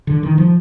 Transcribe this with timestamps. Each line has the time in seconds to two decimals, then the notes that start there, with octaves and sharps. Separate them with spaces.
0.07 D3
0.23 D#3
0.38 F3